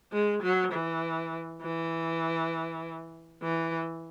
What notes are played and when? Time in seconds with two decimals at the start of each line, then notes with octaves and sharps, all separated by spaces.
0.13 G#3
0.43 F#3
0.72 E3
1.62 E3
3.43 E3